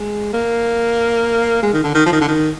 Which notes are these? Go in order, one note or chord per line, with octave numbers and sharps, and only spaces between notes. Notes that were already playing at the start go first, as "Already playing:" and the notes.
Already playing: G#3
A#3
G#3
D#3
D3
D#3
F3
D#3
D3
D#3